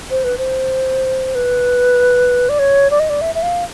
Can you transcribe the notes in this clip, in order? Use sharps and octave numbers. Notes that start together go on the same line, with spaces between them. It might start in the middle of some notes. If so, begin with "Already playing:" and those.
C5
B4
C5
B4
D5
C#5
D5
D#5
D5
E5
E5
F5